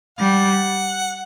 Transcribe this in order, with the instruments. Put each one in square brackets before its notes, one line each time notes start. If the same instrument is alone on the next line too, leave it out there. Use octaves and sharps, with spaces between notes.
[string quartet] G3 [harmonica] F#5